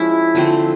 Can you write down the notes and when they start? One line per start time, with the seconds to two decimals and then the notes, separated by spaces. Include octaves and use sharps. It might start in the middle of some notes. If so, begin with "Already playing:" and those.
Already playing: F3 G#3 C#4 E4
0.35 D3 F3 A3 C4